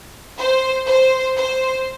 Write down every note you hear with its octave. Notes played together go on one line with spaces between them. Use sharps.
C5
C5
C5